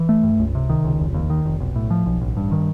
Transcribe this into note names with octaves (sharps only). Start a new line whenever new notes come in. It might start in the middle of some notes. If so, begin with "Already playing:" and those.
Already playing: E3
A3
G2
C#2
C3
D#3
C#2
F1
D#2
D#3
F1
B1
A2
F3
B1
A1
G2
D#3